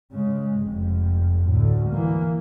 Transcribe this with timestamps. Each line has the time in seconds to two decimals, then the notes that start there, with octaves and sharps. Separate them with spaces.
0.12 C#3 G#3
0.59 F1 F2
1.49 D2 A2
1.89 E3 A#3